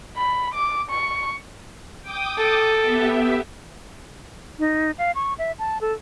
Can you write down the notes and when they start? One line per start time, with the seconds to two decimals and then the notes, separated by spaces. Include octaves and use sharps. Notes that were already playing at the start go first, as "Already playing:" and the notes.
0.17 B5
0.54 D6
0.91 C#6
2.01 G5 D6 D#6
2.37 A4
2.82 B3 G4 E5
4.59 D#4
4.98 F5
5.15 C#6
5.39 E5
5.59 A5
5.81 A4